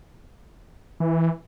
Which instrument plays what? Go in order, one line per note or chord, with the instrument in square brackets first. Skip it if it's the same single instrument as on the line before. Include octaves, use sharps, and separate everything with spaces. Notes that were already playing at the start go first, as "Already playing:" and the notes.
[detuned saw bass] E3